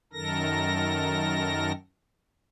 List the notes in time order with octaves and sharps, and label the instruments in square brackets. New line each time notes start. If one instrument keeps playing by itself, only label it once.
[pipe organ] F#2 D#3 A4 A#4 A#6